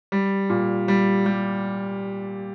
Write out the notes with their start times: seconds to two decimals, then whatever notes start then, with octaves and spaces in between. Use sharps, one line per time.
0.12 G3
0.50 A#2
0.88 G3
1.26 G3